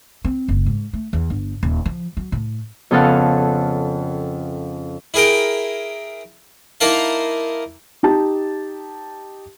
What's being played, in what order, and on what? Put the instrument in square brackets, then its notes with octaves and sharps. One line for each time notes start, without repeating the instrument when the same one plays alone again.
[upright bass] C4
F#1
G#2
A3
E2
G1
D#1
F3
F#3
A2
[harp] F2 C#3 B3 A4 F5 F#5
[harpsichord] E4 G#4 A#4 G5
A#3 D#4 E4 A#4 F5 A5
[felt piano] D#4 G4 A5